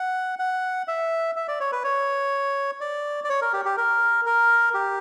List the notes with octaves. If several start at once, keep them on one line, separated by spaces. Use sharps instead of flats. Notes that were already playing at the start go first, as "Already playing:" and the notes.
Already playing: F#5
F#5
E5
E5
D5
C#5
B4
C#5
D5
D5
C#5
A#4
G4
G4
A#4
A#4
G4